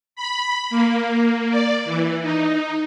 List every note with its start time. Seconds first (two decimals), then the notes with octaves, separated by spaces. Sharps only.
0.16 B5
0.70 A#3
1.50 D5
1.85 E3
2.21 D#4